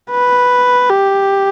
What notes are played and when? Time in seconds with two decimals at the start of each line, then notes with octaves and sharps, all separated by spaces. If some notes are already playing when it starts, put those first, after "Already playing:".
0.11 B4
0.91 G4